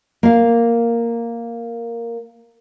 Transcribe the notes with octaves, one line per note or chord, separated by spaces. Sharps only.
A#3 F5